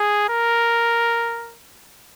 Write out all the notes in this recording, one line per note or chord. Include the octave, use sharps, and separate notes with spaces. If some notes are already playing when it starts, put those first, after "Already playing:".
Already playing: G#4
A#4